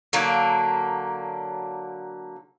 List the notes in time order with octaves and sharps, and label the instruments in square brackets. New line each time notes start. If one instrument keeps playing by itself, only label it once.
[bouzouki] D3 F#3 A#3